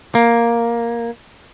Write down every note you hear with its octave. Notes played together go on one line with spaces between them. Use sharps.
A#3